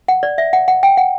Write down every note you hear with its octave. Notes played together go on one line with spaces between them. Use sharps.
F#5
D5
E5
F#5
F#5
G5
F#5